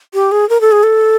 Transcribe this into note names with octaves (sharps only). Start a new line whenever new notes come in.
G4
G#4
A#4
A4
G#4
A4